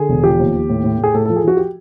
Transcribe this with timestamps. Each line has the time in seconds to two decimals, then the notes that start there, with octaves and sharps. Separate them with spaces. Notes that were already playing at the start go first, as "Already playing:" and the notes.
Already playing: D3 G#4
0.09 E1
0.24 F3 G4
0.39 D#2
0.55 D#2
0.69 A2
0.84 A2
0.99 A2 G#4
1.14 A2 A4
1.25 F3 A4
1.36 G#4
1.44 F3 F#4
1.57 G4